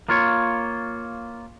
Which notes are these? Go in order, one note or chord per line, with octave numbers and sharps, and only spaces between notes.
A#3 F4 C#5